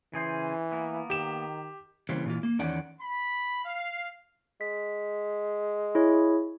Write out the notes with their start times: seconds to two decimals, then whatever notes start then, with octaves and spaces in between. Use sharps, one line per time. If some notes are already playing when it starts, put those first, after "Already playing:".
0.13 C#3 E3 G#4 C5
0.72 A#3 B3
1.10 D#3 G4 E7
2.09 C#3 E3 G3 A#3 C4
2.26 A#2 E3 F4
2.43 A#3
2.59 E2 D#3 C#4 D5 F#5 G#5
3.00 B5
3.65 F5
4.61 G#3 B6
5.95 E4 G#4 C#5